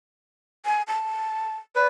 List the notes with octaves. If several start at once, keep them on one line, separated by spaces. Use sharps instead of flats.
G#5
A5
B4 D5